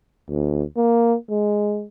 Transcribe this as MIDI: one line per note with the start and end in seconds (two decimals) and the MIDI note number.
0.29 0.63 38
0.77 1.15 58
1.30 1.85 56